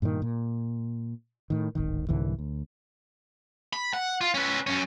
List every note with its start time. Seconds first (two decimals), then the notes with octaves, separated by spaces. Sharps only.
0.02 G2 A#2 D3 D#3
0.22 A#2
1.50 A2 D#3
1.75 D1 G#1 D#3
2.09 C2 G#2 D3 E3
2.38 D2
3.73 B5
3.93 F#5
4.21 F4
4.34 C#4 B4
4.67 F#2 C#4